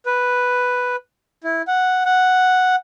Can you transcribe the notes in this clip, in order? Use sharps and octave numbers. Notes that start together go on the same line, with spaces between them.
B4
E4
F#5
F#5